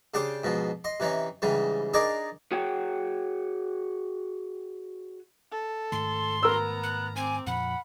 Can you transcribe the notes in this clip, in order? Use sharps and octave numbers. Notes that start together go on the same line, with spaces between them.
C#3 D4 G4 C5 D6
G#2 B2 F3
D#5 C6
C3 E3 C#4 D#4
G#2 C#3 E3 G3
D4 D#4 G#4 A#4 D5 D#5
F#4 G#4 C#5 F#5 G5
A4
G#2 D#3 A3 C6
B3 A#4 A#5 E6
F#6
C4 G#5 D6
F2 A#2 F3 F#5 B5